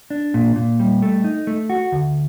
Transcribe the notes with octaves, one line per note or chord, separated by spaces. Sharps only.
D4
A#2
A#2
G3
A3
D#4
A3
F#4
D2